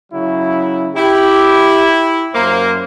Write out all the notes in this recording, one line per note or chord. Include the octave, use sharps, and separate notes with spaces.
C#3 F#3 E4
E4 G4
F#2 A#3 C5